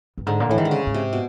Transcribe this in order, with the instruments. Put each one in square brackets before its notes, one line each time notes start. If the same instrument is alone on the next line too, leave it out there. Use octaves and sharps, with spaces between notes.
[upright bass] G2
[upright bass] G#2 [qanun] D3
[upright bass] A#2
[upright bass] A2 [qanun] E3
[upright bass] G#2 [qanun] D#3
[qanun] D3
C#3
[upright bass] G#2
[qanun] C3
B2